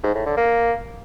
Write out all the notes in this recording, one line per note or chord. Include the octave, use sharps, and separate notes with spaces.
G#2
A2
D3
A#3